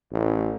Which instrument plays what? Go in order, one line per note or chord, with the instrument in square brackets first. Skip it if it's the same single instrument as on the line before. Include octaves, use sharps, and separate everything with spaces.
[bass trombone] A1